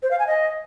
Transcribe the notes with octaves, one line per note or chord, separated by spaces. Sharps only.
C5
F5
G#5
D#5